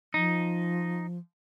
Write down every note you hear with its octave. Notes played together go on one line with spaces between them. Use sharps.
F3 D#4